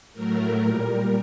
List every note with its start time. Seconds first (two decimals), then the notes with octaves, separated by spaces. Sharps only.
0.13 A2 F#3 A3 A#4
0.61 A#2 G3